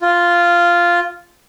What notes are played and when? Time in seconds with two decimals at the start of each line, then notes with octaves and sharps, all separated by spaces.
0.01 F4